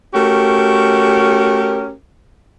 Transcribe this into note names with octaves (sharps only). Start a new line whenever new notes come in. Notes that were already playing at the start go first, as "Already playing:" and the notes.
A3 C#4 F#4 G4 A#4